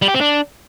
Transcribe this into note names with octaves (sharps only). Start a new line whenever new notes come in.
G3
G4
C4
D4